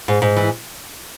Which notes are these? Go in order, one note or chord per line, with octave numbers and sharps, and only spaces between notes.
G#2
G#2
E3